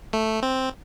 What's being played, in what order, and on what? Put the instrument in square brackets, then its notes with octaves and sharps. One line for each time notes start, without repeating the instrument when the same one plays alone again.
[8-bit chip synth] A3
C4